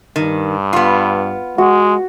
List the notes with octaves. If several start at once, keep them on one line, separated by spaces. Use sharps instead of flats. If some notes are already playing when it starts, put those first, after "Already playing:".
G2 D#3
B3 F4
G#3 F#4